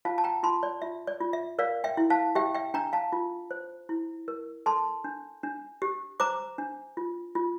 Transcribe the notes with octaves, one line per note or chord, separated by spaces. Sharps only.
F4 F5 A5
A5
G5 A#5
F4 A5 C6
D5
F4 E5
D5
F4
E5
A#4 D5 F5
E5 G5
E4
F5 A5
G4 E5 G5
E5 G5
D4 G5 A#5
F5 A5
F4
C5
E4
A#4
A4 A5 C6
D4
D4
G4
C5 A#5 D6
D4
F4
F4